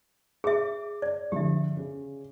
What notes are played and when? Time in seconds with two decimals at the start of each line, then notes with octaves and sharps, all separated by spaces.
0.44 G#4 E5 D6
1.02 D5
1.32 D3 F3 G4 E5
1.77 C#3